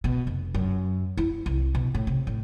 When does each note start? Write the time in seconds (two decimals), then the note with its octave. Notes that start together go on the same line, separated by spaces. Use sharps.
0.04 B2
0.27 F1
0.54 F#2
1.17 E4
1.46 C2
1.75 B2
1.95 A2
2.07 C3
2.27 A2